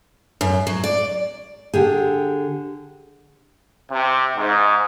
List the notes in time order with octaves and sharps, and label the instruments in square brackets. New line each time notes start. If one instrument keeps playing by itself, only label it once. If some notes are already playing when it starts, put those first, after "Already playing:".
[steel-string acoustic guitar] F#2
F#3
D5
[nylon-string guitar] D3 G4 G#4
[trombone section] C3
G#2